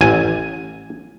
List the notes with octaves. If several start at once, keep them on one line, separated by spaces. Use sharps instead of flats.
A1 G#5